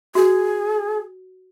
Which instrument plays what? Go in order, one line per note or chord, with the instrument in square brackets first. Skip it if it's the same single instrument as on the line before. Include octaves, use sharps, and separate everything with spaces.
[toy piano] F#4 [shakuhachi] G#4